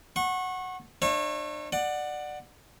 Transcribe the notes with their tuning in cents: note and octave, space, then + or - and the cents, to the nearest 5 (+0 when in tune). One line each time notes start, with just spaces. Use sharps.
F#5 +0 C#6 -30
D4 +40 C#5 -30 E5 +35
D5 +20 F#5 +0